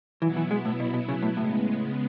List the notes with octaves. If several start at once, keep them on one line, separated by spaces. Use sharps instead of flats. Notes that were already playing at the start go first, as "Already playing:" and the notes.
B2 E3 F#3 B3 E4
E3
G#3
A2
B2
B2
C#3
A2
A2 C#3 G#3 B3